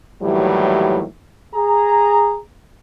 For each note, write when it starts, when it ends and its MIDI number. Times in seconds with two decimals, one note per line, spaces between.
0.21 1.03 39
0.21 1.03 45
0.21 1.03 52
0.21 1.03 54
0.21 1.03 55
1.54 2.38 68
1.54 2.38 82